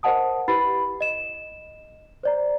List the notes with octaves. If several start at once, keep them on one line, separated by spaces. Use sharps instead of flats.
A#4 C5 D#5 F#5 A5 D#6
E4 G4 B4 B5 A6 C7
D#5 E7
C5 D5 A#5